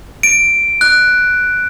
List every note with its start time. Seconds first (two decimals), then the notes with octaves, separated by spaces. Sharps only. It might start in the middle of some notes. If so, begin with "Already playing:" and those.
0.23 D7
0.81 F#6